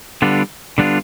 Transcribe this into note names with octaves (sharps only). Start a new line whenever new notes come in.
D3 G3 B3 D4 F4
D3 G3 B3 D4 F4